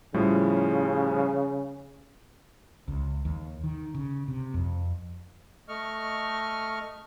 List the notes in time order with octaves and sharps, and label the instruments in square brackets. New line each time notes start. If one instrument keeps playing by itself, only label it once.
[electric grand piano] A2 F3 G3 [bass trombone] C#3
[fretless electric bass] C#2
D#2
D#3
C#3
C3
F2
[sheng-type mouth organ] A3 D#5 C#6 F6